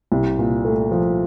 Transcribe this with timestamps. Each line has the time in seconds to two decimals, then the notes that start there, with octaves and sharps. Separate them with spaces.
0.12 C2
0.38 A#2
0.65 A3
0.91 F3